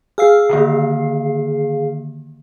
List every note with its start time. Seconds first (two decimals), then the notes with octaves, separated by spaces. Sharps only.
0.18 G#4 F5 E6 F6 C7
0.49 D3 D#3 A#3